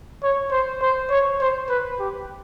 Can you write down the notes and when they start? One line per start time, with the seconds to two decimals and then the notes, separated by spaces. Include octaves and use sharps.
0.23 C#5
0.51 C5
0.82 C5
1.10 C#5
1.41 C5
1.69 B4
1.99 G4